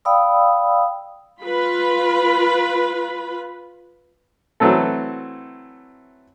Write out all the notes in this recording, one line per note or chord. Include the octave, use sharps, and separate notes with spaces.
D5 F5 G5 B5 D#6 E6
F4 B4 B5
E3 F#3 A3 C4 A4